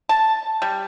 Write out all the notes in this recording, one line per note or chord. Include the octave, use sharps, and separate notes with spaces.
A5
G3